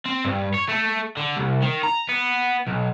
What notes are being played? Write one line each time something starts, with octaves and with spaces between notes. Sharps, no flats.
C4
G2
C#5
A3
D3
C2
D#3
A#5
B3
B1